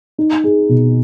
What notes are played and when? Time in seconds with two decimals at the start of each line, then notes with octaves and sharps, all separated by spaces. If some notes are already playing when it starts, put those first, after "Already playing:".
0.18 D#4
0.44 G#4
0.69 B2